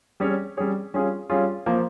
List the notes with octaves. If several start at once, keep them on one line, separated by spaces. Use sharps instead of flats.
G3 C#4 G#4 C#5
G3 C#4 G#4 C#5
G3 C#4 F4 G#4
G3 C#4 F4 G#4
F3 A#3